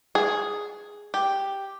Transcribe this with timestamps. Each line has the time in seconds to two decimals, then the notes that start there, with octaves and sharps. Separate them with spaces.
0.15 G#4
1.14 G4